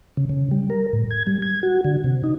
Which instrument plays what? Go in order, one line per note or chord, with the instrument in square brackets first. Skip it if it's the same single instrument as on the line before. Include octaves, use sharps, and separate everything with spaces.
[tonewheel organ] C#3
C#3
G3
A#4
A2
G#6
G3
G#6
F#4
D3
C3
D#4